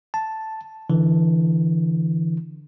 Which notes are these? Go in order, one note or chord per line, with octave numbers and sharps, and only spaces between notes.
A5
D3 E3